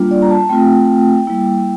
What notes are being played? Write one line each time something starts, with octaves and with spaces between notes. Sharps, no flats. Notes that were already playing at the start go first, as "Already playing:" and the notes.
Already playing: G3 A#3 D4 F4
D5
A#5
A5
A3 C4 F4 G5
G3 A#3 E4